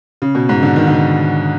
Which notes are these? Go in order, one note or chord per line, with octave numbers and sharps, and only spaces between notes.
C#3
B2
G#2
D3
D#3
D3
D#3